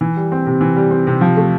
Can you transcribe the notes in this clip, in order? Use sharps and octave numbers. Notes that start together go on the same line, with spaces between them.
E3
G3
C4
C3
E3
G3
C4
C3
F3
A3